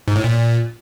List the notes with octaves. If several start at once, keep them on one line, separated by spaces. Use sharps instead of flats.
G#2
A2
A#2